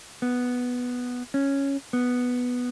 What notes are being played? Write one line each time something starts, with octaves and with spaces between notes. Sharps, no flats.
B3
C#4
B3